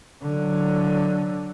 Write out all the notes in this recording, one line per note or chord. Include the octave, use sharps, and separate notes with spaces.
D3 F#3